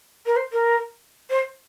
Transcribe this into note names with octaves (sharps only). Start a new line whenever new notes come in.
A#4
C5
A#4
C5